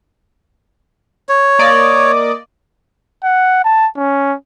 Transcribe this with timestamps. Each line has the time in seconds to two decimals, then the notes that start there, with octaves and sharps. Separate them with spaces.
1.29 C#5
1.59 A#3 D5 D#5
3.24 F#5
3.64 A5
3.97 C#4